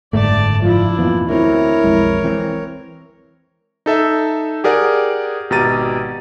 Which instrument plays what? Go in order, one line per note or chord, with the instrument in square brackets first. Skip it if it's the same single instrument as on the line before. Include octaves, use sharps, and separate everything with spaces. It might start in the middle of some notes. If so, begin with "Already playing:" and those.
[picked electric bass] F#1 G#2 D3 [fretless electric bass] A3 [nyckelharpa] D5 A5
[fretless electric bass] F3 [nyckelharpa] D4 E4 [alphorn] F4
[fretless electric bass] F2 A#2 E3 [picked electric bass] B3 [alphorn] F4
[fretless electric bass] D2 A3 C4 [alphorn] E4 [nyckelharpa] A#4 C#5
[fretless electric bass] B1 F2 [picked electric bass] G#3
[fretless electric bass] E3 C4
[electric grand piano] D#4 A4 E5
G4 G#4 A#4 D5 F#5
G#1 B2 G4 A#5 A6 D#7